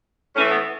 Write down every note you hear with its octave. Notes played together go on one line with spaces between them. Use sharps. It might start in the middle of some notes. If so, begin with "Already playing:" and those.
A2 E3 C#4
A3
B3